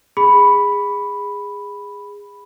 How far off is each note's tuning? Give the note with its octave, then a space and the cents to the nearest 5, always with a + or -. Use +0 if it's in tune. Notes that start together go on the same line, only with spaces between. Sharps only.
G#4 -20 B5 +0